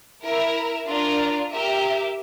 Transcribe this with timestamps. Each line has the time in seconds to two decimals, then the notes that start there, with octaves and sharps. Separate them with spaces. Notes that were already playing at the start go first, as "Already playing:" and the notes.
0.24 E4 A#4 E5
0.87 D4 F4 A#4 D5
1.49 G4 A#4 E5